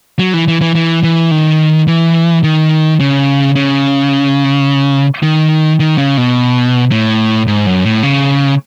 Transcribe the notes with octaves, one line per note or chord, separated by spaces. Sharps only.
F#3
E3
E3
E3
E3
E3
D#3
E3
D#3
C#3
C#3
D#3
D#3
C#3
B2
A2
G#2
F#2
A2
C#3